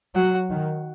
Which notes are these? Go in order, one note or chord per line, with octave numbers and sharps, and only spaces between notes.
F#3 F#4
D#3